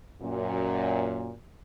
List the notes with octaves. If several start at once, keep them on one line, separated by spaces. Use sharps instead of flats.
F#2 A#2